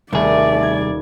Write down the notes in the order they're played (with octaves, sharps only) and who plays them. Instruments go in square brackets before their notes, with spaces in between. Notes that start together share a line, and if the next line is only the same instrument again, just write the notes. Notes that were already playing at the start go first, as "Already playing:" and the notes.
[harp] D#1 [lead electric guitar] C2 G#4 [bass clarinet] A3 [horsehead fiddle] D5
[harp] G#6